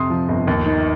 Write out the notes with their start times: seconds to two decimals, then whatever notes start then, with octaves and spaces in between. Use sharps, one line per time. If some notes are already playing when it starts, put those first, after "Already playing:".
Already playing: F2 C3 C6 D#6
0.10 F3
0.29 G1
0.47 D#2
0.66 D#3